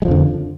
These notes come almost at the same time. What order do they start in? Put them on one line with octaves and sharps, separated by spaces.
G#3 F3 F2 D3